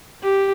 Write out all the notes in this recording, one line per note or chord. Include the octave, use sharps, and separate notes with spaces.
G4